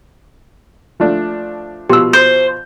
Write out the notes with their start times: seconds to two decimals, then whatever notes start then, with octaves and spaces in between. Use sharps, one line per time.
1.00 F3 A3 D4
1.90 B2 F3 G4 C6 E6
2.13 C5